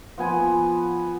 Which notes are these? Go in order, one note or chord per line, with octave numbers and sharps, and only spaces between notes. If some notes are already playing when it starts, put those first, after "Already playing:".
F3 B3 G#5 B5